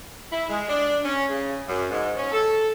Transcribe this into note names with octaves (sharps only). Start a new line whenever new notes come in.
E4
G#3
D4
C#4
C#3
F#2
G#2
C#4
A4